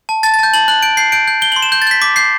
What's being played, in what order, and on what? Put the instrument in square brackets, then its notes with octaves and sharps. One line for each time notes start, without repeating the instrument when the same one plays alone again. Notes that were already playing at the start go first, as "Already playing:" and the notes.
[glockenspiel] A5
A5 A6
A6
A5 G6
A5 F#7
F#6 F#7
G6 D7
G6 C7
G6 D7
G6
G6 G7
F#7
C6
E7
G6
A6
G6 B6
D6 B6
G6 C7